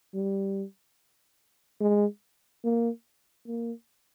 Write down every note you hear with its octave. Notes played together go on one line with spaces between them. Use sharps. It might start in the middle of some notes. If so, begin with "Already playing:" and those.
G3
G#3
A#3
A#3